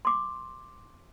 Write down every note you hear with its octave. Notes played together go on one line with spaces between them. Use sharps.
C6 D6